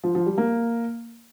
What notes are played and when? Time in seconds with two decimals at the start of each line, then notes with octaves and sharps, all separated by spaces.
0.04 F3
0.15 F3
0.26 G3
0.38 A#3